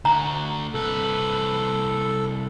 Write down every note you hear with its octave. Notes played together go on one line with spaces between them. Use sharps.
D2 F#4 A#5
C2 A4 B4